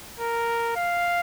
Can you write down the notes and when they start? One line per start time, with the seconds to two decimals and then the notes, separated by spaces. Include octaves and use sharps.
0.19 A#4
0.76 F5